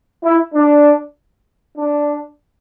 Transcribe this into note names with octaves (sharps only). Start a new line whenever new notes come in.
E4
D4
D4